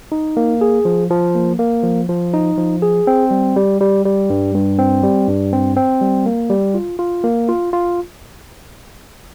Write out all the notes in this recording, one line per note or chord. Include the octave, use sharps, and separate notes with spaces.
D#4
A#3
G#4
F3
F3
A#3
A#3
F3
F3
D#4
F3
G#4
C4
G3
G3
G3
G3
G2
G2
C4
G3
G2
C4
C4
G3
A#3
G3
F4
F4
A#3
F4
F4